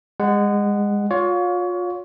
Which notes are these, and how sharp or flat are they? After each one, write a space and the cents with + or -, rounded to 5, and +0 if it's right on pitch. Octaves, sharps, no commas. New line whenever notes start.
G#3 -25 F#5 +0
F4 +30 C#5 +30 F5 +35